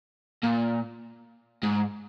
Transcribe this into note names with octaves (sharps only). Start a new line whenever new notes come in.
A#2
G#2